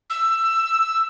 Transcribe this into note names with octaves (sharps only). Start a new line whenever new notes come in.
E6